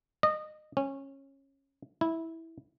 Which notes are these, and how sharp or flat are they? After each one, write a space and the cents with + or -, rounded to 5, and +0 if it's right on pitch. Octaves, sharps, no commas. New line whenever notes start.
D#5 -25
C#4 -20
E4 -15